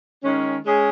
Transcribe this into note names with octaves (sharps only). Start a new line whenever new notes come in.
D#3 G#3 C#4
G#3 C#4 G#4